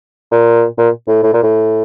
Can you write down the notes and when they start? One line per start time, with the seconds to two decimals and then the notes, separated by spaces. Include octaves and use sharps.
0.31 A#2
0.78 A#2
1.08 A2
1.23 A2
1.33 A#2
1.43 A2